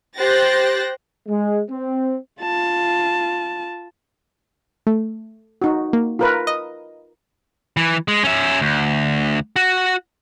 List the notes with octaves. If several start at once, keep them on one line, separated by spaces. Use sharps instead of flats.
G4 C5 G5 F#6 A6 A#6
G#3
C4
F4 A5
A3
D#4 F#4
A#3
F4 A#4 B4
D#5
E3
G#3
C#4 E5
D2
F#4